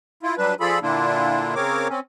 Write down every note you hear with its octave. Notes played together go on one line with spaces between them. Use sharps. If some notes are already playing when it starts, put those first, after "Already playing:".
E4 F4
F#3 G3 D4 B4
F3 F4 G#4 A4 D5 B5
A#2 D3 A#3 D4 E4 F4
C#3 C4 A#4 C#5 D6
C4 C#4